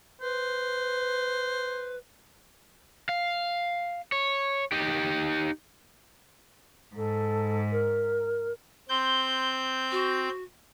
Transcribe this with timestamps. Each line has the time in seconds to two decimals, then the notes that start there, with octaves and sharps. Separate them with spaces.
0.21 B4 C5
3.09 F5
4.12 C#5
4.72 D#4 G4
6.95 G#2 A4
7.71 A#4
8.89 C4 C6 G6
9.91 F#4